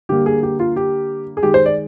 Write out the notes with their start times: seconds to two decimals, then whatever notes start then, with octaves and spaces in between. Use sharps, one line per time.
0.09 D3 G3 A#3 G4
0.26 G#4
0.43 G4
0.59 F4
0.76 G4
1.37 G#4
1.43 D#3 G#3 G4
1.54 C5
1.66 D5